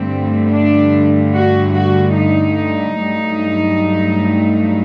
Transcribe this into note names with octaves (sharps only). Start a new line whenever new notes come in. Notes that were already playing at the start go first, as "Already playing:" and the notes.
Already playing: G2 D3 A3 C4
D4
F#4
F#4
D#4
G2 F#3 A3